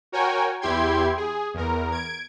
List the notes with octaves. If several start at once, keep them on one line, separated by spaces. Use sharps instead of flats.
F#4 A#4 C#5 G5 G#5
E2 E4 G4 G5 C6 G#6
G#4
E2 A#4
G#6 D7